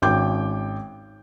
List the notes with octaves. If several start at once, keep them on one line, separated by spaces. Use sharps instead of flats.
G#1 C#4 G5 D6 G6